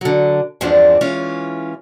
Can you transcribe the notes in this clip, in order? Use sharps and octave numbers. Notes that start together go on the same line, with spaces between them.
D3 F#3
E2 G2 F3 G#3 C4 D4
E3 G#3 C#4 E4 F4